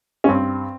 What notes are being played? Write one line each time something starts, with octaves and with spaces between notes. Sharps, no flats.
C#4
G2 C4